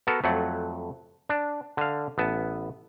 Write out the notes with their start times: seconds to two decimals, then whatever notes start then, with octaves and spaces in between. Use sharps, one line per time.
0.07 B3 F#4 A4 A#4
0.24 F2 F#3 A3 F#5
1.29 D4
1.77 D3 F5
2.18 A1 B3 A5